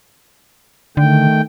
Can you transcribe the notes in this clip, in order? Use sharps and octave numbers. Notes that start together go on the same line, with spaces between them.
D3 D#3 A3 G5